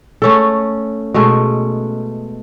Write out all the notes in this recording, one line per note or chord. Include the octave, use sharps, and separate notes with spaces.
A3 C#4 A4
B2 G#3 A3